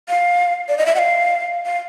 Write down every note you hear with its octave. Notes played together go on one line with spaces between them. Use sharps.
F5
D5
D#5
E5
F#5
F5
F5